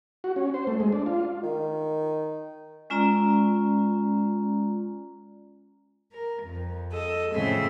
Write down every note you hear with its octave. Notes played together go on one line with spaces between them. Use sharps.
F#4
C#4
C5
A3
G#3
D4
F4
D#3
G#3 C#4 F4 D5 A#5
A#4
F2
A4 D#5
A2 C#3 F3 C4 E5 C6